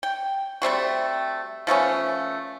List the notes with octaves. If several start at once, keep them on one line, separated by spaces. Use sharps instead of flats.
G5
G3 A3 C4 F#4
F3 A3 B3 C#4